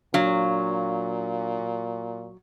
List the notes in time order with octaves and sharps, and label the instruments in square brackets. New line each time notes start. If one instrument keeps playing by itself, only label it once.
[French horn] A#2 [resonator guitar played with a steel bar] F#3 [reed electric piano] D4 F5